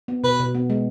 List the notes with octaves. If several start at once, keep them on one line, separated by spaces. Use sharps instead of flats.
B3
B2 B4
B2
B3
G#3